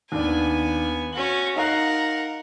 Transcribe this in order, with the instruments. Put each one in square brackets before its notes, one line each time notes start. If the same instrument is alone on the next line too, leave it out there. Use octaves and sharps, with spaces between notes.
[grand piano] D#2 D4 [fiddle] B3 G#5
[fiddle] C#4 F#4 [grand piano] F#7
[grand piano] D#4 F5 F#6 [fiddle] A#4 F#5